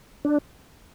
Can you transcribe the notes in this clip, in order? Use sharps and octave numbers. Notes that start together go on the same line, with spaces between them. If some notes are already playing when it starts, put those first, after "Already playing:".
D4